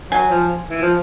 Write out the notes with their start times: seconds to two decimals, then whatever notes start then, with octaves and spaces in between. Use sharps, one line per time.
0.11 F#3 G#5
0.30 F3
0.70 E3
0.82 F3